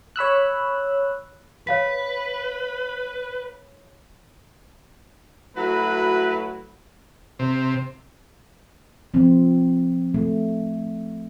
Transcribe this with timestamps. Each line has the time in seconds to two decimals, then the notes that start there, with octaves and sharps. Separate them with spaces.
0.16 C#5 B5 E6 F#6
1.67 B4 C#5 F5 B6
5.57 F#3 A3 E4 F#4 B4
7.39 C3
9.14 F3 C4
10.14 A3